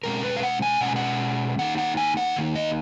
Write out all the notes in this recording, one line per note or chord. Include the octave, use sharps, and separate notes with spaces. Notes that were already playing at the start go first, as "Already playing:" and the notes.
B2 G#3 C#4 A#4
B4
F5
F#5
G#5
B2 G#3 C#4 F#5
G#5
F#5
D#3 A#3 D#4 F#5
F#5
G#5
F#5
D#3 A#3 D#4
D#5